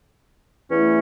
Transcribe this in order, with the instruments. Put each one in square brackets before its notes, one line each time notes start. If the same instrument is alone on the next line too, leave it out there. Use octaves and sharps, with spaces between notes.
[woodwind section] E2 E3 A3 C#4 E4